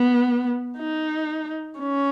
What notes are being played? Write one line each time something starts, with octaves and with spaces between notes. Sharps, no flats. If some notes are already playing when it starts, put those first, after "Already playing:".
Already playing: B3
D#4
C#4